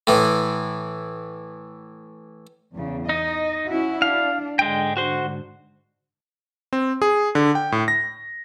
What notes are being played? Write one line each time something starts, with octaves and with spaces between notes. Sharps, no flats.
A2 E3
E2 C#3
D#4 D#5
C#4 E4 F#4
D4 F5
G#2 D3 G#3 G5
F#4 C5
C4
G#4
D3
G5
A2
A#6